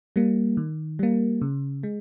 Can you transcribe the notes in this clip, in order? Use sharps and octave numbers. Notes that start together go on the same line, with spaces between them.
G3 A#3
D#3
G3 A#3
C#3
G#3